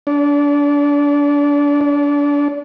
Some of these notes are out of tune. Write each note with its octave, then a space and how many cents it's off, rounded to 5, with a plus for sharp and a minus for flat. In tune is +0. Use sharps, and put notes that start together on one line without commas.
D4 -30
D4 -30